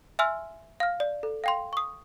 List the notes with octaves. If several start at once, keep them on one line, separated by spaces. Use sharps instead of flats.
E5 G#5 C6 E6 F6
F5 F6
D5
A4
F5 G5 C6
C#6 D#6